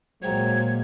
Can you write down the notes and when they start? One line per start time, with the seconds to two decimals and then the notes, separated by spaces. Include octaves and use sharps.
0.22 A#2 F#3 G#3 A#3 C5 G5 A#5 G#6